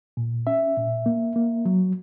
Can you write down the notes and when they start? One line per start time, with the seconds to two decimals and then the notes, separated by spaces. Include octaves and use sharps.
0.17 A#2
0.47 C#4 E5
0.77 A#2
1.06 A#3
1.36 A#3
1.65 F#3